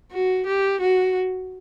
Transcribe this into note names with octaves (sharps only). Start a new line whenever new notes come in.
F#4
G4
F#4